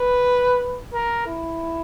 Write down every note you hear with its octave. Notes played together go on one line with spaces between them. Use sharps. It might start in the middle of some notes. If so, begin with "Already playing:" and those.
Already playing: B4
A#4
E4